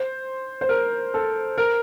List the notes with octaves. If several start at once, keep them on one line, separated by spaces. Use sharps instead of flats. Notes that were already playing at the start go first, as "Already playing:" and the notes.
Already playing: C5
C5
A#4
A4
A#4